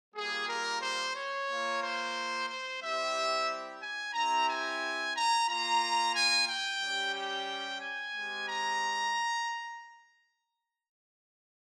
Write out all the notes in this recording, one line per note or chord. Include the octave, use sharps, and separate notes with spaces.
G3 A#3 F4 G#4
A#4
C5
C#5
A#3 F4
C5
C5
G3 C4 E4 G4 E5
G#5
C4 E4 G4 A#5
G#5
A#5
A#3 F4 A#5
G#5
G5
G3 C#4 G4
G5
G#5
G#3 C4 G4
A#5